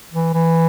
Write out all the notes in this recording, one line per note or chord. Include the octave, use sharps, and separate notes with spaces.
E3
E3